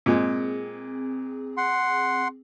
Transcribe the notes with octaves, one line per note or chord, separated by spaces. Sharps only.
A#2 G#3 C4 G#4
F#5 C6